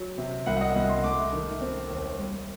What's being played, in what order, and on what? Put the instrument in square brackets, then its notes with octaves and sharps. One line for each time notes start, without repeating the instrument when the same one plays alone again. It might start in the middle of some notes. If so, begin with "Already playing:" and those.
Already playing: [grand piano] F#3
C3
C2 F#5
F#5
D#5
C2 D#5
C6
A3 D6
D#3
C4
D#2
G3